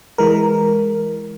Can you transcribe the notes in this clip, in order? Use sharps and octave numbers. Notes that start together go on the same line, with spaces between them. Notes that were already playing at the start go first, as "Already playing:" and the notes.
E3 G#3 A#4